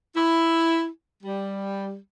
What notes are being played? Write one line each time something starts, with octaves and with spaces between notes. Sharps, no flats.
E4
G3